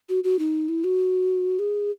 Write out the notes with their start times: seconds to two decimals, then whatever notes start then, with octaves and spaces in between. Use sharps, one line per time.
0.09 F#4
0.24 F#4
0.39 D#4
0.69 E4
0.84 F#4
1.59 G#4